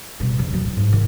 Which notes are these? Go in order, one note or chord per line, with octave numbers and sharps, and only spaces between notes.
B2 G3
F2 D3
D#3 F#3
A2
G#2
D#3 E3